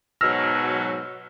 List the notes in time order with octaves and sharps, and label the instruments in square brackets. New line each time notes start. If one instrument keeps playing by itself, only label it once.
[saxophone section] G#2 B2 F#3 [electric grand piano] E6 F6 A#6